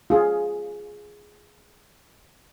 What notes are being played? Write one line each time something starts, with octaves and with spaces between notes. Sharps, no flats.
F4 G#4